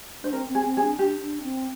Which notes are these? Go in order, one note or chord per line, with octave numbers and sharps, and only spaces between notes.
D4 C5
C4 A#4
C4
G#4
C4
G#4
D4
D4 G4
D4
C4